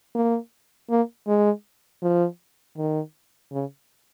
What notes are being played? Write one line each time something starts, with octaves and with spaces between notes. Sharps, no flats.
A#3
A#3
G#3
F3
D#3
C#3